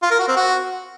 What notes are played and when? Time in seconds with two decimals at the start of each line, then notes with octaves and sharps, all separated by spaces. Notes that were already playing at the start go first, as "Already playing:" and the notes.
0.02 F4
0.11 A#4
0.19 F#4
0.28 C4
0.36 F#4